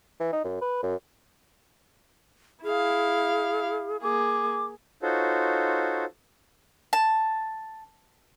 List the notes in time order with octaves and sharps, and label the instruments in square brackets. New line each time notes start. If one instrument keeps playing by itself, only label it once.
[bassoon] E3
D#4
F#2
B4
F#2
[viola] E4 F5 [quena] G#4
[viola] A#3 G#4 [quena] D6
[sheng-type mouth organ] D#4 F4 F#4 A4 C5 C#5
[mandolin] A5